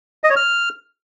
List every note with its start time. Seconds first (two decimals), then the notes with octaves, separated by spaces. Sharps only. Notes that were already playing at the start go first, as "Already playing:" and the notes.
0.24 D#5
0.30 C#5
0.36 F6